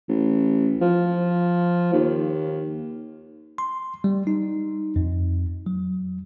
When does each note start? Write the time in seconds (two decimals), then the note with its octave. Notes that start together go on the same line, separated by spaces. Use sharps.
0.09 A1
0.81 F3
1.93 D#2
3.58 C6
4.04 G3
4.27 D#4
4.96 F2
5.66 F#3